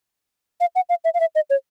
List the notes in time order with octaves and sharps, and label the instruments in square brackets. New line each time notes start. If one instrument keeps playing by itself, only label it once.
[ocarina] F5
F#5
F5
E5
F5
E5
D#5
C#5